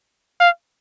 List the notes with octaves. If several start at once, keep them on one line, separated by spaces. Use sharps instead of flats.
F5